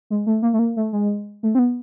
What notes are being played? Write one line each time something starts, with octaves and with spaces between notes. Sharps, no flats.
G#3
A3
A#3
A3
A#3
A3
G#3
A3
C4
B3